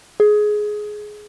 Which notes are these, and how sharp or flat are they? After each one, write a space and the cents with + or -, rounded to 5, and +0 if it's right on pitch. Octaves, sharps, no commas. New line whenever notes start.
G#4 +15